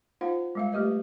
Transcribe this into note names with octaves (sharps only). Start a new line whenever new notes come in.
D#4 F4 C5 F5 F#5
G3 G#3 F5
G3 A3 G4 B4 D#5